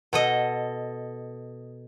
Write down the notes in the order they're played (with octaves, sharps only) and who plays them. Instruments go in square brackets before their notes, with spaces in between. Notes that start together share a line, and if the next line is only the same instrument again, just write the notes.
[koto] B2 A4 D#5